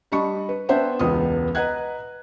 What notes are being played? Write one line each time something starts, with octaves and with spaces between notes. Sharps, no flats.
G3 D4 D#5 B5 C#6
B4
B3 D4 C5 E5 F#5 G5
E1 C#2 B3 D#6
B4 D#5 F#5 A#5 F#6 G#6